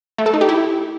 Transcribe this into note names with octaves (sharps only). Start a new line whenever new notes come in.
A3
A4
D#4
G4
E4